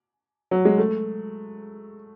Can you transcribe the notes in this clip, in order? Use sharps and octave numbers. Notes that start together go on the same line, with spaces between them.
F#3
G#3
A3